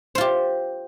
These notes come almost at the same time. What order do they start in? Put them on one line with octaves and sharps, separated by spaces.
C5 F4 G4